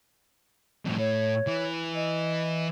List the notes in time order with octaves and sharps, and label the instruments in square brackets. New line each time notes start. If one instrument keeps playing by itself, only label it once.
[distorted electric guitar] F2 A2
[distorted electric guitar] A2 [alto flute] C#5
[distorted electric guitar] E3
[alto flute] D#5